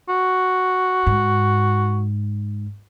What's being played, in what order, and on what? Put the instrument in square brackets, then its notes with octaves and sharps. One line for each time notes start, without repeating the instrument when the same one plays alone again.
[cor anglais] F#4
[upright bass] G#2